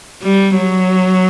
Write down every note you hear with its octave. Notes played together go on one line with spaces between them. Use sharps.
G3
F#3